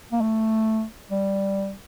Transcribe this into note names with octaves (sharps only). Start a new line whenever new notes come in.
A#3
A3
G3